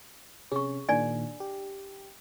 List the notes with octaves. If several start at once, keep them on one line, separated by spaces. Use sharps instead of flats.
C3 C#4 G#4 C#6
A#2 D#3 A#3 D4 D5 G#5
G4